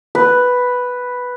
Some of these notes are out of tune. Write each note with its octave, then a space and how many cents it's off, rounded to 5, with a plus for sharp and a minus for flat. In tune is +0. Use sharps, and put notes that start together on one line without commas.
B4 +0